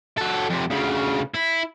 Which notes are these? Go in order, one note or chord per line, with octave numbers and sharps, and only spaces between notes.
F#3 A4
F2 C3
D2 C#3
E4